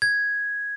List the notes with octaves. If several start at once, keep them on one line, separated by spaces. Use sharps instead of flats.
G#6